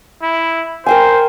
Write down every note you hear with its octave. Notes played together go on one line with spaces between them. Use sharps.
E4
A#4 C5 G5 G#5